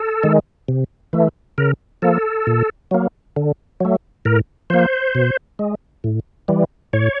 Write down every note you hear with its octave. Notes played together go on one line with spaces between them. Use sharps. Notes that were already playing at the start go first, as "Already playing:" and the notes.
Already playing: A4
D#3 G#3
C3
E3 A3
C#3 A#4
F3 A#3 A4
A#2
F#3 A#3
D3
F#3 A3
A2 A#4
F3 A#3 C5
B2
G#3
A2
E3 G3
A2 C#5